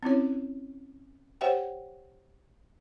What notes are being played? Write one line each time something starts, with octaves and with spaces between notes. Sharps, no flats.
C4 C#4 E4 C#5
G4 C5 C#5 E5 F#5 G5